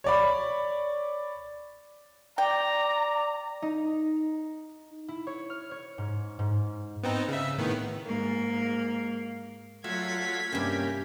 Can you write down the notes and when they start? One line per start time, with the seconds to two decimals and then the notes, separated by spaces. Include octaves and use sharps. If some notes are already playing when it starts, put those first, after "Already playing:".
0.04 C#5 D5 B5
2.38 D5 G5 A#5
3.62 D#4
5.08 E4
5.27 C#5
5.50 F6
5.71 C#5
5.98 G#2
6.39 G#2
7.03 B3 C4 D#4
7.29 C#3 E5
7.58 A2 D#3 B3
8.06 G#2 A#3
9.84 F#3 A3 F4 F#4 E5 G#6 B6
10.52 G2 C3 A#3 C#4 G4